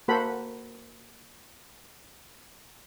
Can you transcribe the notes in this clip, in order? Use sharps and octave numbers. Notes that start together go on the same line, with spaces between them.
A#3 F#4 A4 C5 F#5 B5